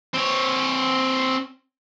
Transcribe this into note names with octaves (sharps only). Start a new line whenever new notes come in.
C4 C#5